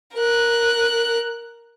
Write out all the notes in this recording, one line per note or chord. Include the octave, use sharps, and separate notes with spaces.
A#4 F#6